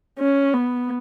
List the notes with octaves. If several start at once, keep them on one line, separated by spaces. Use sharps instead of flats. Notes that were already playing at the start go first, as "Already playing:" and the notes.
C#4
B3